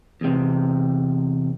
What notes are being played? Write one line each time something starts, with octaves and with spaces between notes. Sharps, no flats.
E2 C3